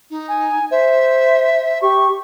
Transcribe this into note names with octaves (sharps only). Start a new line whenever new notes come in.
D#4
G#5
C5 E5
G4 C#6